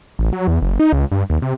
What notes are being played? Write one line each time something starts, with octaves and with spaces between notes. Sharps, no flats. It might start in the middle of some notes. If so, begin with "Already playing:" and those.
A1
F#3
E2
F#1
D#4
C#2
G2
D#2
C3